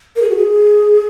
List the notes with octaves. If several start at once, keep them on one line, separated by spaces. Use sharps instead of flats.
A#4
G#4
F#4
G#4